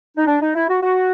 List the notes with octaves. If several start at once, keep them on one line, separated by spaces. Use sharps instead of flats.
D#4
D4
D#4
E4
F#4
F#4